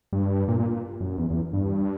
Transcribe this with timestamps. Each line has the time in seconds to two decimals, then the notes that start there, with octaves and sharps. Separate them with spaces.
0.13 G2
0.48 A#2
0.60 A#2
0.71 A#2
1.01 F#2
1.18 E2
1.30 E2
1.53 G2